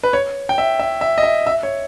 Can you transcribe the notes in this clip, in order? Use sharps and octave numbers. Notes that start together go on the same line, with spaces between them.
B4
C#5
G5
E5
E5
E5
D#5
E5
E5
C#5